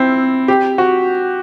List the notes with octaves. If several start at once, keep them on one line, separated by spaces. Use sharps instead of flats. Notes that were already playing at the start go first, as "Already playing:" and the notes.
Already playing: C4 E4
G4
F#4